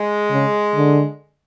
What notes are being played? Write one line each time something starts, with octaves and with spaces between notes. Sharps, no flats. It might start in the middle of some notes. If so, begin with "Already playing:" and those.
Already playing: G#3
C#3
D3